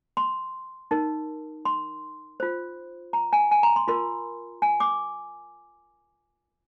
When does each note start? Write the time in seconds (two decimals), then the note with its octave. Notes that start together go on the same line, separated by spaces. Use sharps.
0.17 C6
0.91 D#4 A#4
1.65 C6
2.40 F4 C5
3.13 A#5
3.33 G#5
3.51 G#5
3.63 A#5
3.76 C6
3.88 F4 A#4 C6
4.62 G#5
4.80 D6